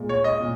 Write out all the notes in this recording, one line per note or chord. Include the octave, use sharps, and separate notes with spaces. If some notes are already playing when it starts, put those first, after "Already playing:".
Already playing: A#2 G#3
C#5
D#5
A#2